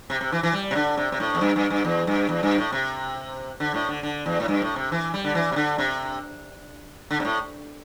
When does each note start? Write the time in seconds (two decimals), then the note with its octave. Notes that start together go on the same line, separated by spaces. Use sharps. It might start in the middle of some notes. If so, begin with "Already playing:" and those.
0.10 C3
0.21 C3
0.32 E3
0.43 E3
0.53 G3
0.71 C3
0.76 D3
0.97 C3
1.12 C3
1.20 A2
1.35 E2
1.41 G2
1.56 G2
1.70 G2
1.85 E2
2.07 G2
2.29 E2
2.43 G2
2.58 A2
2.72 C3
3.60 D3
3.74 A2
3.89 D3
4.03 D3
4.26 E2
4.40 A2
4.48 G2
4.62 A2
4.76 C3
4.92 E3
5.14 G3
5.24 D3
5.35 E3
5.52 C3
5.56 D3
5.78 C3
7.11 D3
7.20 C3
7.25 A2